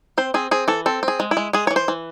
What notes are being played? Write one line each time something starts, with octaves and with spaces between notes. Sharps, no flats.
C4 C5
C4 G#4
C4 G#4
E3 A4
C4 A4
C4
G#4
G#3
E4
G#3
G#3 G#4
E3 C#5
C5
E3